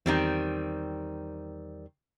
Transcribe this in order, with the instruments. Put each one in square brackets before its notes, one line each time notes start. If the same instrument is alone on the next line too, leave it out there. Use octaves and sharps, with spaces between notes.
[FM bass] E2 [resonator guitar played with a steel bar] D#3 G3 C4